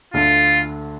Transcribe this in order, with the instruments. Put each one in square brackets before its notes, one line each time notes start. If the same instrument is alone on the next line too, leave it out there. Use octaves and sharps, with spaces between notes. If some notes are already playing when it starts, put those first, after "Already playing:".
[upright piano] D2 D3 [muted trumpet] F4